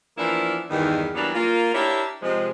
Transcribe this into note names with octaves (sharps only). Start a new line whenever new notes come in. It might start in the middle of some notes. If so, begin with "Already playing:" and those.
E3 F3 A#3 B3 D4 E4
E2 G2 D#3
E3 F#3 G3 A#3 B3 D4
A#3 F4
D4 E4 G4 A#4 C#5 E5
C3 F3 G#3